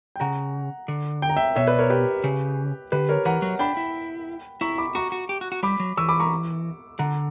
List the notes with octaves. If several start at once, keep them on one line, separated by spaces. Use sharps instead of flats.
G5
C#3 F#5 A#5
D3
G5
A#5
E5 G5
B2 C#5 E5
B4 D5
A#4 C#5
G4 B4
C#3
D3 G4 B4
A#4 C#5
E3 F#5 A#5
F#3
D4 G5 B5
E4
E4 A#5 C#6
B5 D6
F#4 A#5 C#6
F#4
G4
F#4
F#4
G3 B5 D6
F#3
E3 C#6 E6
B5 D6
A#5 C#6
D3 F#5 A#5